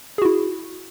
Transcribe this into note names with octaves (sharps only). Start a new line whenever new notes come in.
E4 F#4 G#4